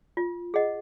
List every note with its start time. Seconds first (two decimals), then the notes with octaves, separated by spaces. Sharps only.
0.17 F4
0.54 G#4 D#5 F#5